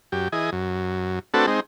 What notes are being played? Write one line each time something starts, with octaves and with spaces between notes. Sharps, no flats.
F#2 G4
E3 G#4 D#5
F#2
A3 C4 D4 F#4 A4 B4
G#3 C4 D#4